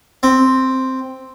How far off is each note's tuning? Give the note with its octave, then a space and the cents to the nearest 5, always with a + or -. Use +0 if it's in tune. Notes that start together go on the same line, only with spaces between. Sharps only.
C4 +0